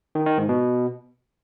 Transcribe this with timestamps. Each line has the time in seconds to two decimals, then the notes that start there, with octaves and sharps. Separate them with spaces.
0.15 D#3
0.26 D#3
0.38 G#2
0.49 B2